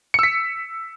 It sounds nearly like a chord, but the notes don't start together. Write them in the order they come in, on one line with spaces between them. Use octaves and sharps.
C#7 E6 B6